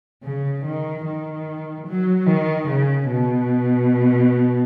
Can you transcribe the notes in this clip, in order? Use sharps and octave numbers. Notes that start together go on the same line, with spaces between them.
C#3
D#3
D#3
F#3
D#3
C#3
B2